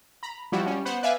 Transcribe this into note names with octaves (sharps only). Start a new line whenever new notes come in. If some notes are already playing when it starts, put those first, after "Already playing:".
A#5 B5
F3 G3 E4 F#4
G3 C#4
B3 C5 F#5
B4 D5 E5 F5 G#5